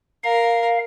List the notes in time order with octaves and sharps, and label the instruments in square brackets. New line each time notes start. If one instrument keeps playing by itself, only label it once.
[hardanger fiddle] A#4 [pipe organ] F5